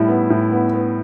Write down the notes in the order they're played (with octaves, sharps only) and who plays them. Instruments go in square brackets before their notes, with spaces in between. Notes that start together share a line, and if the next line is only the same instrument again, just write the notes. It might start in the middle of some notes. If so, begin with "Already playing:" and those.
Already playing: [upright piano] A2 G3 [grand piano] E4
[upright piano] B3
A2
B3
B3